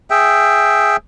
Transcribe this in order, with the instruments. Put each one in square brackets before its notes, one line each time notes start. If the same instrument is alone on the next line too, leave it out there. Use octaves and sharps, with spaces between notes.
[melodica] G#4 E5 G5